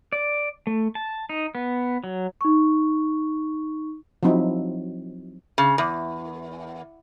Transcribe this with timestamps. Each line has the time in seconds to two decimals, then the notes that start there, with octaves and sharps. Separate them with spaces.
0.12 D5
0.67 A3
0.95 A5
1.29 D#4
1.55 B3
2.04 F#3
2.41 D#4 C#6
4.23 F3 F#3 C4 D#4 E4
5.58 C#3
5.78 E2